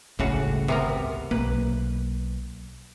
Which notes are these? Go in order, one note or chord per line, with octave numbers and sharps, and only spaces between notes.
G1 C#2 A2 C#3 A3 F#4
C3 B3 A#4
B1 A#3 B4